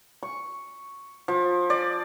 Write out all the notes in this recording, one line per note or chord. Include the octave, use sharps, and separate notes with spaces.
C#6
F3
D5